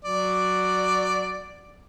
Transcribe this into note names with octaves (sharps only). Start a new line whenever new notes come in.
F#3 D5